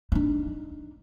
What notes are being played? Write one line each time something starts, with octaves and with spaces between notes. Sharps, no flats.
D4 D#4